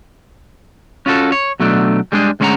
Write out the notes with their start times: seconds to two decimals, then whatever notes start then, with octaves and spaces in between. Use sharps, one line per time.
1.06 C#4 F4 F#4 A4
1.32 C#5
1.60 B2 F#3 A3 D4
2.12 G3 G#3 B3 D4 G#4
2.40 D2 G#3 C#4 F5 F#5 A#5